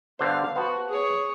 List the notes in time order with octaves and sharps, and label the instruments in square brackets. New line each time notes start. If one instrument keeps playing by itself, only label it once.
[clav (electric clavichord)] G2 D3 C5 [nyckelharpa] B3 F5
[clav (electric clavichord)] B3 C5 A5 [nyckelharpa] F#4
[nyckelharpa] G#4 C#5